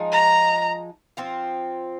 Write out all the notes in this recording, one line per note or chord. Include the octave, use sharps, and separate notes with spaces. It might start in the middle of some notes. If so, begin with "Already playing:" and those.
Already playing: F3 G#3 D#4
A#5
F3 C4 F4